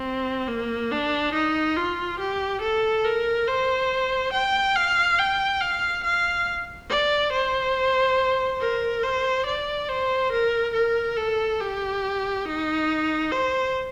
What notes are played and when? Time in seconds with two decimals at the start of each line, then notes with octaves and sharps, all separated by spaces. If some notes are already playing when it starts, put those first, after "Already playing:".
Already playing: C4
0.47 A#3
0.91 D4
1.33 D#4
1.76 F4
2.19 G4
2.61 A4
3.04 A#4
3.47 C5
4.33 G5
4.76 F5
5.19 G5
5.61 F5
6.04 F5
6.90 D5
7.32 C5
8.60 A#4
9.03 C5
9.46 D5
9.89 C5
10.32 A#4
10.74 A#4
11.17 A4
11.60 G4
12.45 D#4
13.32 C5